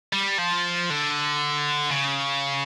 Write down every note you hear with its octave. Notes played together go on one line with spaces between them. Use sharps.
G3
F3
D3
C#3